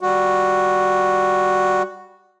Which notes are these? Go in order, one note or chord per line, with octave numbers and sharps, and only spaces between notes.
G3 F#4